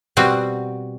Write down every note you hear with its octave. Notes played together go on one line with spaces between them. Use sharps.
B2 G3 C4 F#4